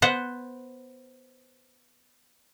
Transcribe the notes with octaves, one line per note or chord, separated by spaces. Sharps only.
B3 C5 F#5